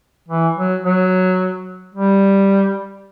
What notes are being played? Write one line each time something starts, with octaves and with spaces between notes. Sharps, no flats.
E3
F#3
F#3
G3